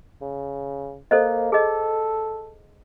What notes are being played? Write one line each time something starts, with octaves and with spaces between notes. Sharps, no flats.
C#3
A#3 A4 C5 D#5
G#4 A4 D#5